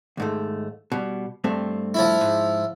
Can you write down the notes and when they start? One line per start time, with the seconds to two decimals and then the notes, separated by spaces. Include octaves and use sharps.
0.17 D#2 G#2 A3
0.92 B2 G3
1.44 G2 A3 C4
1.94 F3 E4
2.21 G#2